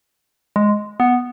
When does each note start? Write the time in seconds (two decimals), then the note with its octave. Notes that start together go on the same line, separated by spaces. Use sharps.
0.56 G#3
1.00 B3